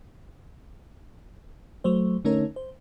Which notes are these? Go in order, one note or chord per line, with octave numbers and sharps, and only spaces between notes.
F#3 A3 C5
D3 A3 C#4 D#4 A#4 C#5
C5